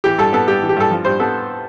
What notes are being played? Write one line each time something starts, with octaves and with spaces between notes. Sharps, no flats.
E3 G4
G2 A4
B3 A4
G2 G4
E3
G4
G2 A4
F3
G2 C5
B3 A4